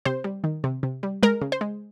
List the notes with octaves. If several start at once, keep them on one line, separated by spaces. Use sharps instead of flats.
C3 C5
G3
D#3
C3
C3
G3
G#3 A#4
C#3
C5
G#3